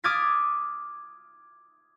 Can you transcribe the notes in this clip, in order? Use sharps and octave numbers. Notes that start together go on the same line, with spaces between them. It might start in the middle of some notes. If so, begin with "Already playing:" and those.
D6 D#6 F6 G#6 A6 B6